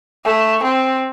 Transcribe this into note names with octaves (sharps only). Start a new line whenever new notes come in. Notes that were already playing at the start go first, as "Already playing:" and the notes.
A3
C4